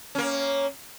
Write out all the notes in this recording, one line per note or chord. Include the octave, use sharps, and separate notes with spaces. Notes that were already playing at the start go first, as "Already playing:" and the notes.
A#3 C#4